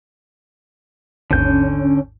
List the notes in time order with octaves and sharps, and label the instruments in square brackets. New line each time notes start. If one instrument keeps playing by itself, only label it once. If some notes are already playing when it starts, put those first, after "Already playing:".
[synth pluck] G#1 D#2 G#2 [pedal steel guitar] D3 G6 [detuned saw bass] C#4